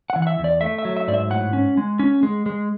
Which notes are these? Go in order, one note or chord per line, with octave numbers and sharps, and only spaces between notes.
F#5
E3
F#5
E5
E2
D5
A3 E5
E5
F#3
E5
G#2 D5
E5
A2 F#5
C#4
G#3
C#4
G#3
G#3